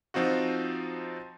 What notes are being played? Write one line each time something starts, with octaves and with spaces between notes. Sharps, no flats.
F3 C4 D#4 F4 F#4